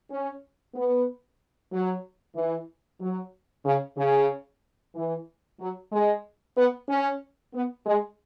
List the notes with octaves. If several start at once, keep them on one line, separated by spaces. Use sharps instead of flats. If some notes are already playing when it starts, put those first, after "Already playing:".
C#4
B3
F#3
E3
F#3
C#3
C#3
E3
F#3
G#3
B3
C#4
B3
G#3